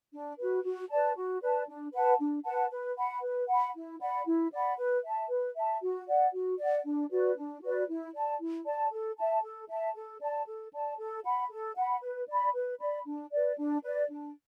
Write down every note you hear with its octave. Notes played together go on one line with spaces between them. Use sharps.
D4
F#4 B4
F#4
B4 D5 A5
F#4
B4 D5 A5
D4
B4 F#5 A5
D4
B4 F#5 A5
B4
F#5 B5
B4
F#5 B5
E4
D5 F#5 B5
E4
D5 F#5 B5
B4
E5 A5
B4
E5 A5
F#4
D5 F#5
F#4
D5 F#5
D4
F#4 B4 D5
D4
F#4 B4 D5
E4
D5 A5
E4
D5 A5
A4
E5 A5
A4
E5 A5
A4
D5 A5
A4
D5 A5
A4
F#5 B5
A4
F#5 B5
B4
D5 B5
B4
D5 B5
D4
B4 D5
D4
B4 D5
D4